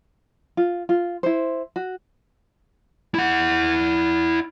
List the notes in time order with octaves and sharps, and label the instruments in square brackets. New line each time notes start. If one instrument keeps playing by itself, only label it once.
[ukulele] F4
F4
E4 C5
F#4
[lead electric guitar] E4 F#5